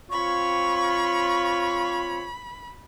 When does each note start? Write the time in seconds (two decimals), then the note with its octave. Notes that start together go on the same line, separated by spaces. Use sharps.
0.10 C4 F4 C#5 B5 C#6